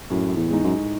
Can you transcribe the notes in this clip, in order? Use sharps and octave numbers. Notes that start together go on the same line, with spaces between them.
F#2 A2
E2
G#3 D#4
F#2